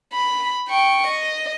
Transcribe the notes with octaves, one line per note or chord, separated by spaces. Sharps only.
B5
G5 C#6
D#5